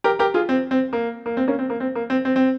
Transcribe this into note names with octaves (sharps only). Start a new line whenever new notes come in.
G4 A#4
G4 A#4
F4 G#4
C4
C4
A#3
A#3
C4
A#3 C#4
C4
A#3
C4
A#3
C4
C4
C4